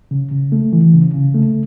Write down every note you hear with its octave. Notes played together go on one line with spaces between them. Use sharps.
C#3
C#3
A3
E3
C#3
C#3
A3